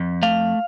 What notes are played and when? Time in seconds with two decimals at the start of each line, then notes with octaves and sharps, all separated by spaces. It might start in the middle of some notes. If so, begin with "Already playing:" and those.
Already playing: F2
0.23 A3 F5